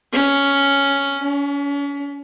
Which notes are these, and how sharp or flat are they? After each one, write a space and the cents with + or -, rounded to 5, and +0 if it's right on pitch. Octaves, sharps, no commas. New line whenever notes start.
C#4 +5
C#4 +40